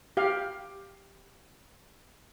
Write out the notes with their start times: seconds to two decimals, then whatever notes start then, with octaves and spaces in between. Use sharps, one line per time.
0.17 G4 F5